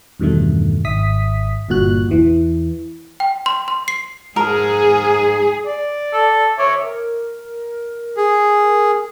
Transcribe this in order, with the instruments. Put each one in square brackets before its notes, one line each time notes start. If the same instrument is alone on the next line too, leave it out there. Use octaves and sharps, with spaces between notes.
[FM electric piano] E2 G2 B2 D#3 A3
G#1 E5 D#6 B6
G1 G2 A#2 F#4 F#6
E2 E3
[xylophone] G5
C6
C6
C7
[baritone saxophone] G#2 [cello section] G#4 [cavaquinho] A#4
[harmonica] D5
[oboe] A4
[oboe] C#5 [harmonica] E5 D6
[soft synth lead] A#4
[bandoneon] G#4